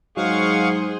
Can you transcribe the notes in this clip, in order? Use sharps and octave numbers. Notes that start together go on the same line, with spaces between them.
G#2 F#3 G#4 C5 F5 F#5 C#6